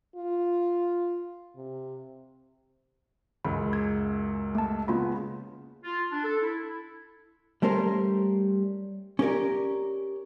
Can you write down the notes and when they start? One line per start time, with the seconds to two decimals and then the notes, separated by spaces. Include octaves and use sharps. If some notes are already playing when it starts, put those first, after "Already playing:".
0.16 F4
1.56 C3
3.45 C#2 F#2 G#3 B5
3.73 G#6
4.55 A3 A5
4.88 C#3 G#3 A#3 B3 F4 B5
5.84 F4
6.11 D4
6.24 A4
6.42 E4
7.62 G3 A3 C#4 A#4 C5
9.19 C#4 G4 A#4 D5